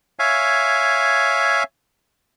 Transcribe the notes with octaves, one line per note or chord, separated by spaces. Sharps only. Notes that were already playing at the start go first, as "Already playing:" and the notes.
C#5 E5 F5 G#5